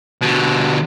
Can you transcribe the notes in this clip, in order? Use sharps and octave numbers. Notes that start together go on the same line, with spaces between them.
B2 D3